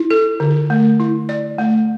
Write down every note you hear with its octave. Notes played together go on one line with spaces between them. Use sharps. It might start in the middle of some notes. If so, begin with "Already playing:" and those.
Already playing: E4
A4
D3
A3
E4
D5
A3